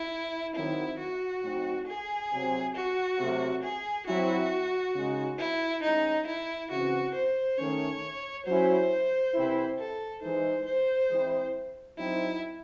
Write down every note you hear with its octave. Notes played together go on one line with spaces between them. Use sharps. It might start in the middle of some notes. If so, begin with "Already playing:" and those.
Already playing: E4
D#3 F#3 C4 E4
F#4
A2 F#3 C4 D#4
G#4
C3 F#3 C4
F#4
C3 F#3 A3
G#4
F#3 C4 E4 F#4
C#3 G#3 D#4
E4
A2 E3 G#3 C#4 D#4
E4
C#3 E3 C4 F#4
C5
D#3 A3 C#4 C#5
F#3 C#4 E4 C5
C3 E3 C4 E4
A4
E3 G#3 D#4 C5
C5
E3 G#3 C4 E4
F#3 C4 D#4 E4